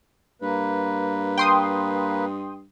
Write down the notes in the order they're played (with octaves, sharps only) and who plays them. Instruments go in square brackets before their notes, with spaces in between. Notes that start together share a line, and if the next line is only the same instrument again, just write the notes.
[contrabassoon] G2 [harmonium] A#3 B4
[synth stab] G5 C6 D#6